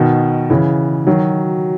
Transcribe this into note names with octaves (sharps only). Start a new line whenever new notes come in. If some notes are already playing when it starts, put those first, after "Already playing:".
Already playing: B2 D#3
C#3 E3
D#3 F#3